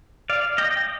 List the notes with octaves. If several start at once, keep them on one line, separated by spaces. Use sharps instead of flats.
D5 F5
D#5 G5